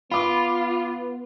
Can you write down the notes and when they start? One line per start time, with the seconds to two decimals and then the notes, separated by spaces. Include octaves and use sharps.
0.11 B3 F4 B5 D6